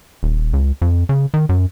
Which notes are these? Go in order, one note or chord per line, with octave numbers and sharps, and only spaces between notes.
D#1
C#2
F2
C#3
D#3
F#2